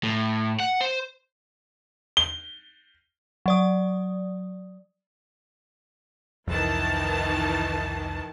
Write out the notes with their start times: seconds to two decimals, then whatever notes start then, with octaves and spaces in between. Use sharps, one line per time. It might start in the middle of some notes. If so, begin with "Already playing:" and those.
0.03 A2
0.60 F#5
0.81 C5
2.17 G7
3.46 F#3 D5 D#6
6.48 C2 F2 D#3 E3 A5